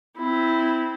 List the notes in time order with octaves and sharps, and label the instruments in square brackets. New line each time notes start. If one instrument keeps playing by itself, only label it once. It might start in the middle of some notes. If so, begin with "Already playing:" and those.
[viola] C4 E4